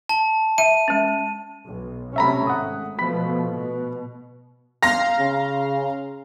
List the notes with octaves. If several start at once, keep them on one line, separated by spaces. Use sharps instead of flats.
A5
E5 D#7
G#3 C#4
B1
C3 A3 C#4 E5 A#5 B5
G#1 F#5 D#6
B2 F3 A3 B5 B6
B2
F5 A#5 C6 A#6
C#3